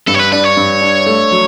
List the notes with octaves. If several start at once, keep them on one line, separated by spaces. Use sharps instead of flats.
G2 A4
C#5
B4
D4 B4
C#5
G2
D4
A3
F#3